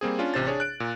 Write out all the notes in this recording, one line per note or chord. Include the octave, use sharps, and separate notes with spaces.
G3 A#3 C4 G#4
C#4 D4 F4
A1 C3 C5 A6
D4 G#4 C#5
F#6 D7
A#2